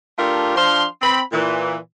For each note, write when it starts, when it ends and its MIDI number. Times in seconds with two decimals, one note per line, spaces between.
0.18 0.53 57
0.18 0.53 62
0.18 0.53 65
0.18 0.53 67
0.18 0.53 70
0.55 0.84 53
0.55 0.84 62
0.55 0.84 77
0.55 0.84 84
1.01 1.20 60
1.01 1.20 83
1.32 1.75 46
1.32 1.75 52